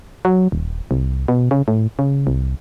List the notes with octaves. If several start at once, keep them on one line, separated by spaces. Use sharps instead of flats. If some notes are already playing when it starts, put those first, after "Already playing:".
F#3
D#1
C2
B2
C#3
A2
C#3
C2